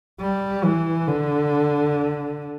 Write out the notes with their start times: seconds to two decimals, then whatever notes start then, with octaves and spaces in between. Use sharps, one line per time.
0.21 G3
0.64 E3
1.07 D3